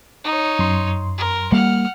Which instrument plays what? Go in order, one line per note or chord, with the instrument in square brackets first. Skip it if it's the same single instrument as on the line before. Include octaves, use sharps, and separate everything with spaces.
[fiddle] D#4 C#5
[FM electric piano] F#2 C6
[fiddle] A#4
[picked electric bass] G3 A#3 [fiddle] F#5 F6